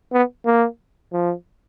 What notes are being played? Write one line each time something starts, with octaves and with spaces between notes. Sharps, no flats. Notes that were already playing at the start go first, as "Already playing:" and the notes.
B3
A#3
F3